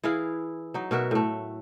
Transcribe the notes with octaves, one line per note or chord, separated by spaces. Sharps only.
E3 E4 G#4 F5
F#3 D#4
B2 F#4 A#4 E5
A2 A3